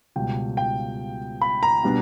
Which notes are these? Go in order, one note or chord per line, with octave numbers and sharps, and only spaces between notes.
C#2 B2 G3 G5
G5
B5
A#5
B2 G3 B3 D4